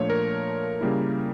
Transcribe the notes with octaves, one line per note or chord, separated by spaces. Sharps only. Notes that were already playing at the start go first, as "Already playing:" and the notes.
Already playing: A#2 F3 A3 D4 F4 C#5
A#4
C#3 G3 A#3 E4